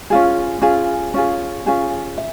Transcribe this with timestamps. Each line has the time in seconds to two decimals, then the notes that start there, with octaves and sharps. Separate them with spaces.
0.10 C#4 F4 G#4
0.62 C#4 F4 G#4
1.14 C#4 F4 G#4
1.66 C#4 F4 G#4
2.18 E5